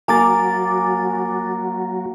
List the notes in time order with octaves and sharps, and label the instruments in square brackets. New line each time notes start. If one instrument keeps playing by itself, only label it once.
[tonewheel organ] F#3 F#4 [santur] A#3 A#4 [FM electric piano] G#5 D6 A6